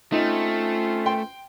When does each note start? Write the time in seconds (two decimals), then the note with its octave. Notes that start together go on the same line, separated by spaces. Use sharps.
0.12 A3 C4 C#4 D#4 F4
1.06 G5 C6